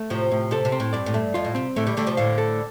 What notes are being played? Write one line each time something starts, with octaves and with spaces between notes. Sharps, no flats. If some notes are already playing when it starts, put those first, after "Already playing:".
Already playing: A3
A2 C3 F3
A2
C3 A4
C3
C4
A2
G2 D5
A2
G2 A3
F2 F4
A2
C3 C4
A2 D3 A3
D3 G3
D3 G3 A3
C3 F3
A2 D3 F5
A4